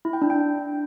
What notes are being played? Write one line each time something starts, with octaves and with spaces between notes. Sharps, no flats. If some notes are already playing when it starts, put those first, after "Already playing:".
E4
G5
D4
G5